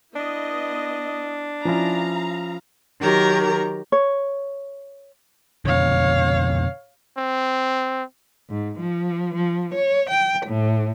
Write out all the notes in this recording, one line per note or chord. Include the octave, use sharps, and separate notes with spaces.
B3 D4 E4 D#5
F3 C#4 E4 F5 A#5
D#3 F#3 G4 A#4 A#5
C#5
F2 B2 D3 C#5 F5
C4
G#2
F3
F3
C#5
G5
A2